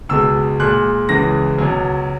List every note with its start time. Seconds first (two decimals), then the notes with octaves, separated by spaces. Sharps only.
0.09 C#2 B2 G#3 E6
0.60 A#2 G#3 F#6
1.09 C#2 C#3 E3 G#3 A#6
1.58 C#2 B2 F#3